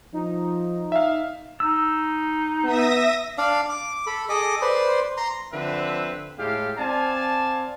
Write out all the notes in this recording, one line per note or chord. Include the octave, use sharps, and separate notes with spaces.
F3 D#4
E5 F5
D#4 E6
B3 E5 D#6 A#6
D4 D5 F5
D6
A4 B5
G#4 A4 D#5 D6
B4 C5 D5 C6
A#5 C6
D3 F3 C4 B4 E5
A2 G#3 G4 A4 F5
C4 D5 F5 G#5 A5